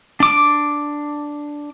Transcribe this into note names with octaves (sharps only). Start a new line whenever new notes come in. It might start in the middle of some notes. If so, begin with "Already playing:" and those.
D4 D6